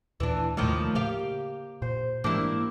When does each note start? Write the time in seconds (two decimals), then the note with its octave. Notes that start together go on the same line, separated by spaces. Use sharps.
0.20 D#2 A#2 E3 D4
0.57 D#2 A2 C3 D#3 F3 G#3 A#3 D#5
0.95 C#3 G4 F5
1.82 A#2 C5
2.24 G#2 E3 G#3 A#3 D4 E4 G4